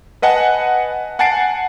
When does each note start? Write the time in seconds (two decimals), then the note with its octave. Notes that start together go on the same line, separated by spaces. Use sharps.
0.22 B4 D#5 F#5 G#5 A5
1.19 F#5 G#5 A5 A6 C7 D7